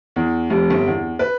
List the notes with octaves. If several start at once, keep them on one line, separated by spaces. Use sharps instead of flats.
E2
F1
G1
E2
B4